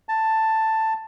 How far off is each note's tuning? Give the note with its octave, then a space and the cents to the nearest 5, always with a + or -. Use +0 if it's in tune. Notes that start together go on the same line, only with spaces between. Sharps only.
A5 +10